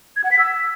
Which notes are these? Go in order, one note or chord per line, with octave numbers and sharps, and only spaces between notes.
G#6
F#5
B6
E6